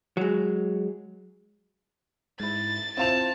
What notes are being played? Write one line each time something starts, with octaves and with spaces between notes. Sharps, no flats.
F#3 G#3
G#2 E4 A6
C4 E4 F4 C5 A5 F7